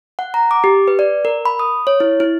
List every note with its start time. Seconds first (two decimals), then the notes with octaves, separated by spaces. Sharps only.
0.19 F#5
0.34 A#5
0.51 D6
0.64 G4
0.88 B4
0.99 D5
1.25 A#4
1.45 B5
1.59 D#6
1.87 C#5
2.00 E4
2.20 E4